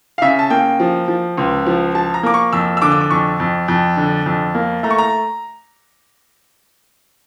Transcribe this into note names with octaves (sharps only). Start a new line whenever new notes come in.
F5
C#3 E5
A5
A#3 G5
F3
F3
C#2
F3
F3 A5
A#5
A#3 D6
C#6
F2 E6
E6
D3 D6
E6
D6
F2 C#6
F2
F2
D3
F2
A#3
A3 A#5
C#6
A#5